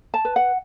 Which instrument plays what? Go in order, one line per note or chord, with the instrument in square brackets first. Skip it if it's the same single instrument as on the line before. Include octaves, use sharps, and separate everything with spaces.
[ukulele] A5
B4
F#5